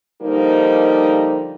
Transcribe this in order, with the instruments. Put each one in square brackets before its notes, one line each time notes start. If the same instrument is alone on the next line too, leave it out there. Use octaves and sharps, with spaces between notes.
[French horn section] D3 F3 G3 A#3 D#4